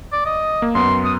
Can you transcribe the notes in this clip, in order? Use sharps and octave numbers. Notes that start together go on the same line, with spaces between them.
D5
D#5
A#3
F#2 B3 C6
D#6